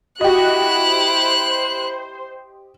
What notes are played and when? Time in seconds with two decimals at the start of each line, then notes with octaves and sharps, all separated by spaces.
0.21 E4 F#4 G4 D#5 F#6
0.80 C5